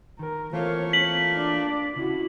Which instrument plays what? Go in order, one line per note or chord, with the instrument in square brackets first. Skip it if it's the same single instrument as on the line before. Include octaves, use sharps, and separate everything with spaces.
[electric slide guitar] D#3 [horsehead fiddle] A#4
[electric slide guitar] E3 A#4 [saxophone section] A3 A#3 F4 [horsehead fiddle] C4 C#5
[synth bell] B6 F#7
[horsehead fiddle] D4 D5
[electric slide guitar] C#3 C#4 D4 [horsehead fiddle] E4 F#4